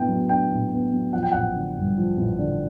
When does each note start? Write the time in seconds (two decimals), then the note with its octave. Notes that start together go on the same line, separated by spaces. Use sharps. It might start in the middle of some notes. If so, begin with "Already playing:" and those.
Already playing: A2 B3 D4 G5
0.08 F#3
0.29 D4 G5
0.51 A2
0.72 B3
0.92 F#3
1.13 F3 F#5
1.23 G5
1.32 A1 F#5
1.55 D3
1.76 G2
1.98 F3
2.18 A1
2.39 D3